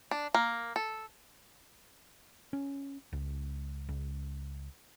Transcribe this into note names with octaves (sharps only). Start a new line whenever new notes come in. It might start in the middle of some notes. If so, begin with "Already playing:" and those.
D4
A#3
A4
C#4
C#2
C#2